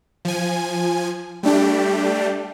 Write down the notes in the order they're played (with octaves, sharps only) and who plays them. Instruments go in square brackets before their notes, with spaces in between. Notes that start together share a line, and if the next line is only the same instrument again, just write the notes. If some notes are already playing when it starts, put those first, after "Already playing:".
[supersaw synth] F3 G#5
G3 A3 D4 G4